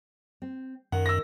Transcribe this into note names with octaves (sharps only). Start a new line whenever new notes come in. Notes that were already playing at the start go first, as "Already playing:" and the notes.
C4
F#2 D#3 F#5
E6 A#6